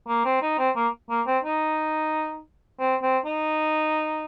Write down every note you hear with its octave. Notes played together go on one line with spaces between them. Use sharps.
A#3
C4
D#4
C4
A#3
A#3
C4
D#4
C4
C4
D#4